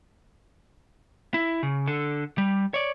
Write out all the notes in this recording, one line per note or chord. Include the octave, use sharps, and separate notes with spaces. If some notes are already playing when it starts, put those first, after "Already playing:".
E4
C#3
D3 A4
G3
C#5 D5